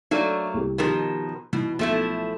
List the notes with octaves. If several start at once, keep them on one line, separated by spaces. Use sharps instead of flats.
F#3 A3 A#3 D4
C2 G4
B2 D#3 F3 G4 A#4
B2 E3
B1 F3 A3 E4